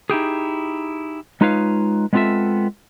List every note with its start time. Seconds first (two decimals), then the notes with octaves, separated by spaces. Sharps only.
0.10 D#4 E4 G4 G#4
1.41 G#3 D#4 F4 B4 C#5 F5
2.13 G#3 B3 C4 F4 A4 E5